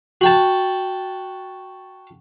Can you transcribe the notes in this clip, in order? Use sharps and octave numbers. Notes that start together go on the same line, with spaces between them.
F#4 G5 A5